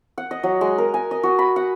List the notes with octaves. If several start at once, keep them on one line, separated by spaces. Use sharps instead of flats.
F#5
D#5
F#3
G#3
A#4
G#5
D#5
F#4
B5
F#5